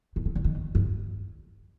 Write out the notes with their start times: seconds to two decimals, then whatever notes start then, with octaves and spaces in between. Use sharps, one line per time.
0.16 B2
0.25 C3
0.35 D3
0.44 D#3
0.75 G2